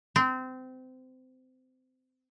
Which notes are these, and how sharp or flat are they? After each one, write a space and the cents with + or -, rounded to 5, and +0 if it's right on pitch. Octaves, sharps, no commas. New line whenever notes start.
C4 -25